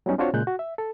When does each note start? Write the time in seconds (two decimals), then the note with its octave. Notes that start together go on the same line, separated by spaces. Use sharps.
0.06 F#3 G3 B3 C#4 D#4
0.18 C4 D4 F4 F#4 C5 C#5
0.34 A#2 C#3 G#3 F#6 G6
0.47 F#4
0.59 E5
0.78 A4